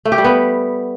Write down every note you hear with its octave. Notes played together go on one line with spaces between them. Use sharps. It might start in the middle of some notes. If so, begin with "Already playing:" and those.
A3
G4
G3
B3